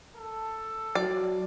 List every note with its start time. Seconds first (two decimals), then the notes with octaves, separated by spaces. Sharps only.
0.16 A4
0.95 F#3 D5